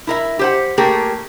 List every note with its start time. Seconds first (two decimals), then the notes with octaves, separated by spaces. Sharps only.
0.07 E4 A#4 E5
0.39 G4 C5 F#5
0.77 A3 A#3 G4 G#4 A#4